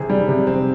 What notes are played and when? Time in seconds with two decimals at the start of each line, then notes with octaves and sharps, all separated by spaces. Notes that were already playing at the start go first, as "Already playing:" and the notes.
Already playing: C3 C4 G#4
0.10 G3
0.28 C3
0.47 C4